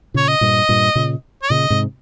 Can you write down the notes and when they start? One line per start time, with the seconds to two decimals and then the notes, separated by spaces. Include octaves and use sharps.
0.14 A#2 C#3 C#5
0.28 D#5
0.41 G2 A#2
0.69 G2 A#2
0.95 A#2 C#3
1.42 C#5
1.50 A#2 C#3 D#5
1.70 G#2 C3